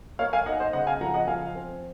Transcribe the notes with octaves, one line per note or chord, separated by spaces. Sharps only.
A#3 C#5 F5
F5 G#5
D#4 D#5 F#5
C5 D#5
C#3 D#5 F#5
F5 G#5
F3 F#5 A#5
D#5 F#5
F3 F5 G#5
C4